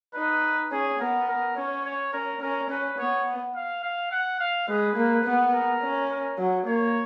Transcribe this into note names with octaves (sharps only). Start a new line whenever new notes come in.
D#4 B4
C#4 G#4
B3 A#4
A#4
C#4 C#5
C#5
C#4 A#4
C#4 A#4
C#4 B4
B3 C#5
F5
F5
F#5
F5
G#3 B4
A#3
B3
A#4
C#4
A#4
F#3
A#3 C#5